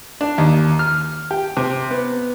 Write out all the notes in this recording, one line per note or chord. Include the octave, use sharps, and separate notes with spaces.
D4
D#2
F6
G4
C3
B3